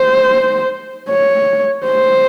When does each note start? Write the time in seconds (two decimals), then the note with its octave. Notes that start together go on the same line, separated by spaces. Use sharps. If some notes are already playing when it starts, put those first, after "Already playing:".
Already playing: C5
1.09 C#5
1.86 C5